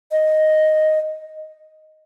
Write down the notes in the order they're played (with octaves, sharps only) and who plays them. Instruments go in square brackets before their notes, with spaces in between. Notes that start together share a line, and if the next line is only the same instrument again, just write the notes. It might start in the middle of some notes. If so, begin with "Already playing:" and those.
[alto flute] D#5